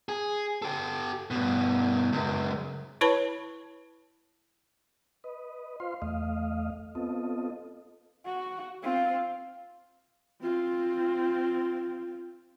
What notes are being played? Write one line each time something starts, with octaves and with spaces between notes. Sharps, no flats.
G#4
G4 A4
G2 B2
C#2 F#2
E4 B4 C#5 A5 B5
B4 D#5
F4 C5 F5 C6
E2 A3 D#5 F5
B3 C4 F4 A4 D#5
F#4
C4 F4
C4 F4